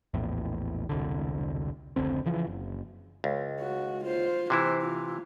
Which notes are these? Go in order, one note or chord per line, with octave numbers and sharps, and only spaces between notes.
A#1 E2 A2
E1 C2 D3
F1 C#2 D3 C4
C#3 E3 F3
F#1
C#2
F#4
F4 C5
C3 E3 E4 C5
F4